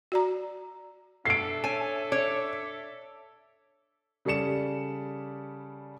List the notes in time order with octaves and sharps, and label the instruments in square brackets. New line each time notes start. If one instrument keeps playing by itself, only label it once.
[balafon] F#4 D5 A#5
[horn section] D4 A4 E5 [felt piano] C7 D7
[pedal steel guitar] C#5 A5 [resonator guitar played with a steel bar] G#5
[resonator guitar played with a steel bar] C#5 [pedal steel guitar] D6
[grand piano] C#3 G3 A4 D5 C#7 E7